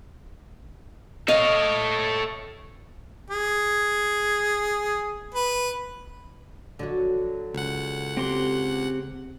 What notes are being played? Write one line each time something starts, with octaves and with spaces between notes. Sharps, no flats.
A4 C#5 D#5 F5
G#4
B4
A#1 D3 F#3 F#4
C#2 C#3 F#5
C4 G4 C6